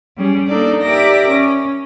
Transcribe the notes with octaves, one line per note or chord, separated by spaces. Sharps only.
G3 C#4 G#4
A#3 D4 D#4 A4 D5
G4 A#4 D5 E5 D6 A#6
C#4